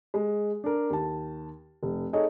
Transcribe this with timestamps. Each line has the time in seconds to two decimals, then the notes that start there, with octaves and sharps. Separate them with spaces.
0.14 G#3
0.64 D4 A#4
0.90 D#2 A5
1.83 F1
2.13 D#4 G#4 A4 C#5 D#5